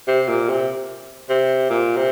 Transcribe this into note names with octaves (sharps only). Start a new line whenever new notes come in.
C3
A#2
C3
C3
A#2
C3